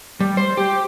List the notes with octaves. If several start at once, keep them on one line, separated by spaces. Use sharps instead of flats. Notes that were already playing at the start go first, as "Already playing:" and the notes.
G3
C5
G4